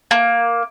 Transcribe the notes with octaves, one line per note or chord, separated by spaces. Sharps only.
A#3